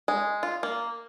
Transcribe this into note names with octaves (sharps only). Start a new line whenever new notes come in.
G#3
F4
A#3